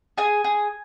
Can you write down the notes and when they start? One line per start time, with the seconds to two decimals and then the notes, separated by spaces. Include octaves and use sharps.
0.17 G#4 G#5
0.44 G#4